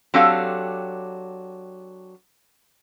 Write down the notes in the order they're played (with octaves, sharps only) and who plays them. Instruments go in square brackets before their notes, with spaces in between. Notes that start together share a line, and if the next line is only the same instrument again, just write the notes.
[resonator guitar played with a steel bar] F#3 C4 D4 G4 A4 F5